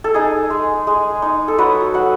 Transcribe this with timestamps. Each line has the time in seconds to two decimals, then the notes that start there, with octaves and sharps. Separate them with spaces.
0.04 A4
0.14 D#4 G#4
0.50 G#3
0.87 G#3
1.22 D#4
1.48 A4
1.58 F#3 B4
1.94 F#3 F#5